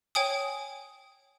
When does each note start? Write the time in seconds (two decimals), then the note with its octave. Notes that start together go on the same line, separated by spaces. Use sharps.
0.15 C#5 G5 G#5 D#6